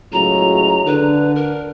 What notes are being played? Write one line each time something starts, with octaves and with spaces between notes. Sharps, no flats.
C#2 A2 F#3 A#5
D3 B4
A#4